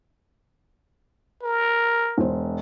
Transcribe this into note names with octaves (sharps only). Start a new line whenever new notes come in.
A#4
E1 C5